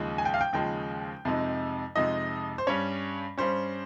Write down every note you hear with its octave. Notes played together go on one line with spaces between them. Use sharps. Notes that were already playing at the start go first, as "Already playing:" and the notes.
Already playing: D#2 C#3 F3 G#3
G#5
G5
F5
G5
D#2 C#3 F3 G#3 G5
F2 C3 F3 G#3 D#4
F2 C3 F3 G#3 D#4 D#5
C5
G2 G3 C#4 C#5
G2 G3 C#4 C5